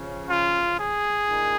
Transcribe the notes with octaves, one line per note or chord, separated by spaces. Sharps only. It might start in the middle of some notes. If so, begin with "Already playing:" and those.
Already playing: C#3 F3 C#4
F4
G#4
A#2 A#3 D#4